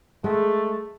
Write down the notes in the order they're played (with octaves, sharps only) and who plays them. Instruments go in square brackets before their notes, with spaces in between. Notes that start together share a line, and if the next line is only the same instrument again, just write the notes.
[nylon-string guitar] G#3 [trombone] A3